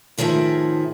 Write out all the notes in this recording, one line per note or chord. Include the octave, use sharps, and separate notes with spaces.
A2 D#3 F3 G#4 E5